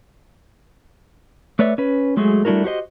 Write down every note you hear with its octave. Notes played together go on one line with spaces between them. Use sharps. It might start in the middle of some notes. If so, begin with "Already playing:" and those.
A3 B4 C#5 D5 E5
C#4 B4
F#3 G#3 A3 F#4 G#4
G3 A3 D4 E4 F#4 A#4
F#4 G4 C5 D#5